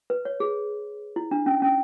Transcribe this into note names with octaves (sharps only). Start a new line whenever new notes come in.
B4
C#5
G#4
E4
D4
C#4
C#4